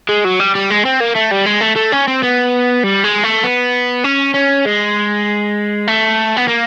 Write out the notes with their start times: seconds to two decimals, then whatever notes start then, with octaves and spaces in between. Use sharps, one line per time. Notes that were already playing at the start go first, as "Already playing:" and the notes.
0.09 G#3
0.24 F#3
0.39 G3
0.55 G3
0.70 G#3
0.85 C4
1.01 A#3
1.16 A3
1.32 G3
1.46 G#3
1.61 A3
1.76 A3
1.92 C#4
2.08 C4
2.23 B3
2.83 G3
3.04 G#3
3.24 A3
3.44 B3
4.04 C#4
4.35 C#4
4.66 G#3
5.88 A3
6.37 B3
6.48 A#3